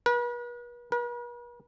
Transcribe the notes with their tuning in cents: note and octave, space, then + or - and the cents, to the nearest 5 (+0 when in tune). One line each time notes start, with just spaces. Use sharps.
B4 -40
B4 -45